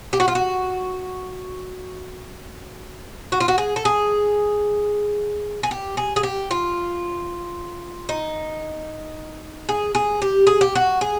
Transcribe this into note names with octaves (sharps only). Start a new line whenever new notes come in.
G4
F#4
F4
F#4
F#4
F4
F#4
G#4
A4
G#4
G#4
G4
G#4
G#4
G4
F4
D#4
G#4
G#4
G4
G#4
G4
F#4
G#4